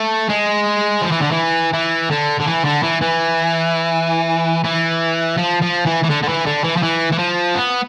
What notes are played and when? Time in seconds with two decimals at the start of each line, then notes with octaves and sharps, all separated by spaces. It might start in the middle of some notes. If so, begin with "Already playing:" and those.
Already playing: A3
0.29 G#3
1.01 F3
1.11 E3
1.21 D3
1.31 E3
1.73 E3
2.10 D3
2.39 D3
2.47 E3
2.64 D3
2.83 E3
3.01 E3
4.64 E3
5.37 F3
5.61 F3
5.85 E3
6.03 E3
6.09 D3
6.23 D3
6.28 E3
6.46 D3
6.64 E3
6.76 F3
6.83 E3
7.12 E3
7.18 F3
7.55 B3